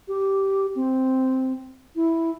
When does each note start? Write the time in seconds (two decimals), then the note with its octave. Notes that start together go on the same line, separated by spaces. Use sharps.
0.08 G4
0.75 C4
1.96 E4